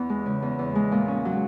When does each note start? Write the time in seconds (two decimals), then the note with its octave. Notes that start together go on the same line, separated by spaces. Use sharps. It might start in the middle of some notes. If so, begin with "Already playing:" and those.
Already playing: E2 E3 B3
0.10 G#3
0.26 C#3
0.42 E2
0.59 E2
0.75 G#3
0.92 A#2
1.08 C#4
1.25 F#3